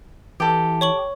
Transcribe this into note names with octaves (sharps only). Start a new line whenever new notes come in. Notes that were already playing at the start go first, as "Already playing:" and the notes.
E3 G4 A4
C#5 C#6 F#7